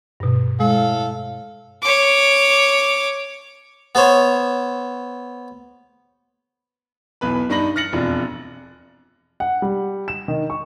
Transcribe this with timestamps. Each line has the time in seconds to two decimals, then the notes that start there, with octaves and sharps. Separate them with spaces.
0.20 G2 B2
0.60 A2 G#3 A4 F5
1.83 C#5 D6
3.95 B3 A4 C5 C#5
7.21 B1 E2 B4 B5
7.49 G2 D4 D#4 B5 A#6 F#7
7.76 F6 A6 A#6 C#7 F#7
7.93 E1 F2 F3 D4
9.40 F#5
9.62 G3
10.08 E7
10.28 D#3
10.50 C#6